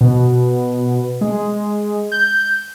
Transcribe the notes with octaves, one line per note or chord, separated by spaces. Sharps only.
B2
G#3
G6